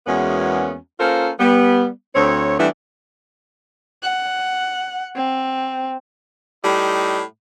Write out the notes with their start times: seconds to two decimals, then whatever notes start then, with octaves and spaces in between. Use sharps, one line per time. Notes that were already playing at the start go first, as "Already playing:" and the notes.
0.07 E2 G#3 A#3 B3 C#4 F#4
1.00 A#3 C#4 F4 A4 A#4 C5
1.40 G3 B3
2.15 D2 C4 C#5
2.60 E3 G3 A3 B3 D4 E4
4.03 F#5
5.16 C4
6.63 A2 G3 D#4